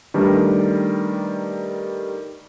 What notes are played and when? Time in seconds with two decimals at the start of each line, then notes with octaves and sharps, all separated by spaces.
0.14 D#3 G3 A3 D4 A#4 B4